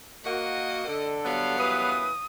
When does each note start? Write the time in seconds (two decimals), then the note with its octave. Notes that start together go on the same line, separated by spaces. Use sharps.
0.24 A#3 F#4 D#5
0.87 D3 A4
1.24 F#3 G3 B3 C#5 F5
1.58 F#2 E3 B4 D#6